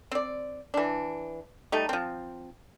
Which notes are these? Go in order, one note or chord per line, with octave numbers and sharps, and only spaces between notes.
C4 D5
E3 D4
G3 A3 D#4
F3 C4